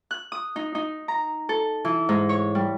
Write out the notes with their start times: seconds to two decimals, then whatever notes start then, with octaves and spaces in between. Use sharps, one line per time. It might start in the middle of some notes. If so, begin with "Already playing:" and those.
0.11 F#6
0.32 D#6
0.56 D#4
0.75 D#4
1.08 A#5
1.49 A4
1.85 E3
2.09 G#2
2.29 C#5
2.55 G3